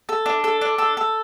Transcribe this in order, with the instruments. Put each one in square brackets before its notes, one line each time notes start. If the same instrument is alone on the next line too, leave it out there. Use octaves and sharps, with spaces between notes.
[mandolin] A4
D4
A4
D4
A4
A4